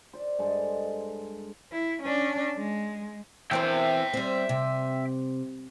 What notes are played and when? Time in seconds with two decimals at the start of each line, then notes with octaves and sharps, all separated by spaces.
0.13 C5 D5
0.39 G2 G#3 A4 D#5
1.72 E4
2.03 C#4 D4
2.57 G#3
3.51 E3 C4 A#4 E5 G5
4.13 G3 C4
4.49 C3